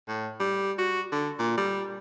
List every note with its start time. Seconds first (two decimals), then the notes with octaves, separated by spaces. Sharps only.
0.08 A2
0.40 G3
0.79 F#4
1.12 D3
1.39 A#2
1.57 G3